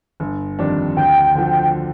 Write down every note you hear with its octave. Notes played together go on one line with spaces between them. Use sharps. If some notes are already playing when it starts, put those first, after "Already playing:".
G1
F2 D#3 G3 D4
D2 G5
D3 F3